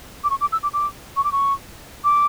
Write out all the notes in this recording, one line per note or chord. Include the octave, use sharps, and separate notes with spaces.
D6
C#6
D6
E6
D6
D6
C#6
D6
C#6
D6